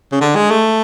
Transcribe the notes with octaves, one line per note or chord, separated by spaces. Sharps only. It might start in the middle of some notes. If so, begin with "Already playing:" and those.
C#3
D3
G#3
A3